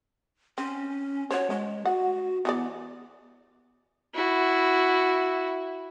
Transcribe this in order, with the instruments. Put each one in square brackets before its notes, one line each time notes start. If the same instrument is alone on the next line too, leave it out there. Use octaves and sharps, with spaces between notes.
[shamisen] C4 [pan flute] C#4
[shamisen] F#4 C5 [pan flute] C#5
[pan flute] G#3 [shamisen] C#4
[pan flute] F#4 [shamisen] F#5
[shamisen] E3 G4 D5 [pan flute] B3
[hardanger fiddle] E4 F#4